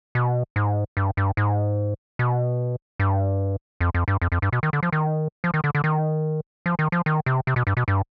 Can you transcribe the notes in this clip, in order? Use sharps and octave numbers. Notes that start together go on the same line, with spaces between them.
B2
G#2
G2
G2
G#2
B2
G2
F2
F2
G2
F2
F2
G2
B2
D#3
D3
F3
D#3
F3
D#3
D3
D3
D#3
F3
D#3
F3
D#3
C3
C3
B2
G2
B2
G2